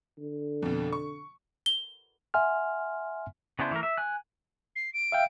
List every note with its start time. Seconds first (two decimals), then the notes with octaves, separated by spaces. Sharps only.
0.18 D3
0.62 F2 B2
0.92 C#6
1.66 G7
2.34 E5 F#5 G#5 C6 F6
3.59 C#3 B3 D4 E4 C5
3.71 E3 A3 A#4
3.83 E5
3.98 G#5 F#6
4.76 C7
4.93 D7
5.12 E5 F5 G5